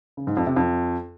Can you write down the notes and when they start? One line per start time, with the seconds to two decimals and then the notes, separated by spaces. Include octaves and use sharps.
0.17 C#3
0.27 G#2
0.37 F2
0.47 C3
0.56 F2